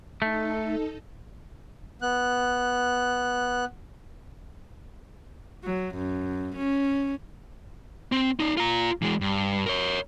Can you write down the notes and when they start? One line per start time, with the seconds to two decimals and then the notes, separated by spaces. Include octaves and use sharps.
0.22 A3 D#4 A4
2.02 B3 F#6
5.64 F#3
5.95 F#2
6.56 C#4
8.12 C4
8.40 D#4 D5
8.57 F4 A#5
9.02 E3 G#3
9.21 G2
9.66 A#4 C#5